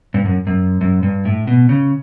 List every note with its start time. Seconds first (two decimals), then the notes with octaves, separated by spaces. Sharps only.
0.14 G2
0.25 F#2
0.47 F#2
0.81 F#2
1.03 G2
1.25 A2
1.47 B2
1.69 C#3